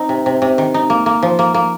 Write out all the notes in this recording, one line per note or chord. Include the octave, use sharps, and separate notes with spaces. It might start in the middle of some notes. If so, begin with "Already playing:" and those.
Already playing: C4 D#4
C3
C3
C3
D#3
D#4
A#3
A#3
F3
A#3
A#3